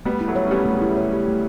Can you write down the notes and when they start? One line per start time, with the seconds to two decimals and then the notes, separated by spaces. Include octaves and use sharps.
0.05 G3 A3 B3
0.21 E4
0.28 F#3 A3
0.36 C#5
0.47 C#4
0.51 G3 B3 G4
0.66 A3
0.73 C#3
0.82 E4
0.97 C#5
1.13 G4
1.28 A3